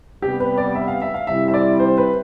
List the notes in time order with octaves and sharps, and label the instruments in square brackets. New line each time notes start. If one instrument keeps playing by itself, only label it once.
[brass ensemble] C3 G3 B3 [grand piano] G4
[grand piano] B4
D5
E5
F5
E5
F5
[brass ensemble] C3 G3 C4 E4 [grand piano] E5
[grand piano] E5
D5
C5
B4